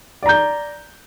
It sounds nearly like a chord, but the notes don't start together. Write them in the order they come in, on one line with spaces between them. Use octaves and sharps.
D5 A#5 G6